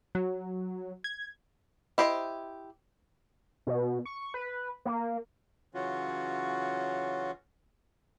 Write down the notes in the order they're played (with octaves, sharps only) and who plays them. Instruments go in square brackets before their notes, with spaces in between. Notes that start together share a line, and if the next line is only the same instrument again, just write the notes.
[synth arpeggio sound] F#3
G#6
[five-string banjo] E4 G4 C5 D#5
[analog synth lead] B2
C#6
B4
A#3
[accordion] C#3 E3 F#3 C#4 F4 F#4